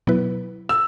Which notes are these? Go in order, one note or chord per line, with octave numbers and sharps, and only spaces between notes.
B2 F#3 B3 E4 B4
E6